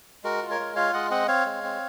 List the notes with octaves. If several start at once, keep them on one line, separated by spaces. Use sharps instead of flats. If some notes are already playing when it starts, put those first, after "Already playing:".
G#3 F#4 A#4
F4
A#4 C#5
G#3
F4 C#5 F5
G#3 D#5 F#5
C4 D#5 F#5
C4 C#5 F5
G#3
C4